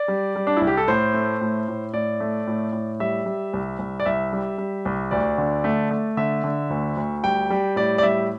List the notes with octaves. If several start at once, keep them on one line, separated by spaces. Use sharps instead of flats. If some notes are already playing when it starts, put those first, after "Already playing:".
Already playing: D5
G3
G3
D4
C2 E4
G4
A4
A2 C5
A3
A2
A2
A2 D5
A3
A2
A2
G3 E5
G3
C2
C2
D5
C2 E5
G3
G3
C2
D2 D5
D3
A3
A3
D3 E5
D3
D2
D2
G3 G5
G3
A2 D5
D5
G3 E5